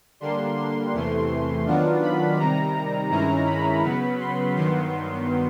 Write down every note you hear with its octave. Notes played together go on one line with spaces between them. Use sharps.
D3 G3 A#3 D4 C6
C6
E2 C3 E3 A3 C6
D#3 F#3 B3 D4 F4
B5
C3 D#3 G3 A#5
G2 D#3 G#3 C#4 E4 A#5
B5
C#3 F#3 B3
C6
G2 D#3 F#3 B3 C6